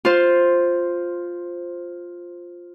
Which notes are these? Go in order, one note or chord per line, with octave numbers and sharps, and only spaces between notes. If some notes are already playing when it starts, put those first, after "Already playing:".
F4 C5